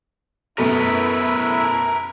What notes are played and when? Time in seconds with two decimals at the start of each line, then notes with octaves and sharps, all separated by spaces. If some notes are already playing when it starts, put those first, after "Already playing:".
0.58 F#2 B2 A3 E4 A#4 B4